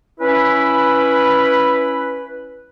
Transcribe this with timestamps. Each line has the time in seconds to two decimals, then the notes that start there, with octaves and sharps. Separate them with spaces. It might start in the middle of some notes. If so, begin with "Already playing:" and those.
0.20 C#4 E4 B4